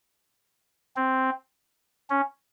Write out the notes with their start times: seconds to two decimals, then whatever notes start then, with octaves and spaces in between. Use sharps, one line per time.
0.96 C4
2.10 C#4